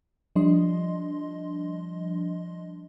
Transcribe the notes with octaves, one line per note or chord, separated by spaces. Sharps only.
F3 G3 D4 D#5 C6